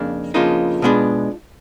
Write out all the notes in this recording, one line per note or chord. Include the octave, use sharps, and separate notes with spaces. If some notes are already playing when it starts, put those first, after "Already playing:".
Already playing: F2 C#3 A#3 D4
F2 C#3 F3 A#3 D4 D#4 F4
B2 G#3 B3 D4